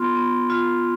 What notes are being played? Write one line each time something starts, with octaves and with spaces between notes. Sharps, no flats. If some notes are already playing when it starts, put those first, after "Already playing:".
Already playing: B3 F4 C6
B3
F4